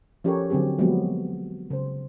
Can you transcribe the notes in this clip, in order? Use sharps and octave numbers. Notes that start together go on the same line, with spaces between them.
F3 C#4 G4 A4 A#4 C#5
D3 F#3 C4 G4 G#4
F3 F#3 G#3 A#3 B3 G4
C#3 C5